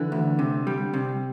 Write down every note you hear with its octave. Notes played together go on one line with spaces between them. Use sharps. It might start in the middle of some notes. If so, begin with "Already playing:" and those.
Already playing: D3 E3
D2
C3
G3
C3